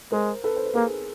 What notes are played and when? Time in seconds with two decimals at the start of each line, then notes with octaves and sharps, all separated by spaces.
0.12 G#3 A#4 C5
0.44 A4 B4
0.56 C5
0.66 B4
0.75 A#3 G#4 A#4